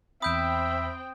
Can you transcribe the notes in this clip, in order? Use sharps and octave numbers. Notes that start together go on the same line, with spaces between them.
E2 C4 E5 G5 B5 D#6 G6 D7